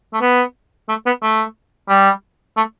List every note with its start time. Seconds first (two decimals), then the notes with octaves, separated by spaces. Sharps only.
0.13 A3
0.21 B3
0.89 A3
1.06 B3
1.23 A3
1.89 G3
2.57 A3